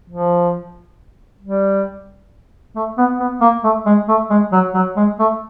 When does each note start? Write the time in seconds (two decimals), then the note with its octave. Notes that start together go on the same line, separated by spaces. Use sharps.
0.10 F3
1.43 G3
2.76 A3
2.98 B3
3.20 B3
3.41 A#3
3.64 A3
3.86 G#3
4.09 A3
4.30 G#3
4.53 F#3
4.74 F#3
4.97 G#3
5.19 A3